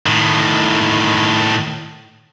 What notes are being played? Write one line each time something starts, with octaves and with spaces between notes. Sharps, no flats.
A2 D#3